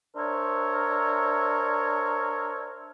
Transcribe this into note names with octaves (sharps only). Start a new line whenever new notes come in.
D4 A#4 C5 C#5 E5